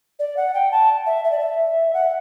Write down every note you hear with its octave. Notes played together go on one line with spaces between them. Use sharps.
D5
F#5
G5
A5
E5
E5
D5
E5
F#5